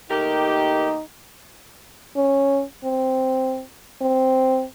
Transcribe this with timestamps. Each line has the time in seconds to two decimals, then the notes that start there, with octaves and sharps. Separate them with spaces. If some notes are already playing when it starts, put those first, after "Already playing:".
0.11 D#2 A3 D#4 G4 A#4
2.16 C#4
2.84 C4
4.01 C4